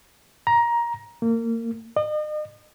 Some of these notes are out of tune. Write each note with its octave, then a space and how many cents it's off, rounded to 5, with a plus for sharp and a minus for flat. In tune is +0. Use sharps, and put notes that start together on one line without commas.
A#5 +15
A#3 -25
D#5 -40